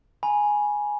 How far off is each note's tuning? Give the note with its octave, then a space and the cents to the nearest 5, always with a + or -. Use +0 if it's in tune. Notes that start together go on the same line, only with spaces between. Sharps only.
G#5 +0 B5 -35